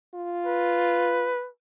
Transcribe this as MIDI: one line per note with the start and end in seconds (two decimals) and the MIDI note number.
0.15 1.33 65
0.46 1.49 71